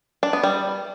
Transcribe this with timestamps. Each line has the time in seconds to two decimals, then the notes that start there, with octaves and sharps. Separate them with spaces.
0.23 D4
0.33 B3
0.43 G3